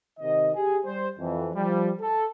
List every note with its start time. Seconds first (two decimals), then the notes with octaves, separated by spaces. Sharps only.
0.19 C3 D#3 D#5
0.55 G4 G#4
0.85 G3 C5
1.19 F2 E3
1.55 F3 G3
2.00 A4